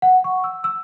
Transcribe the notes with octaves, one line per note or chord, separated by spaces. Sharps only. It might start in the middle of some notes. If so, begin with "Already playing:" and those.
F#5
C#6
E6
E6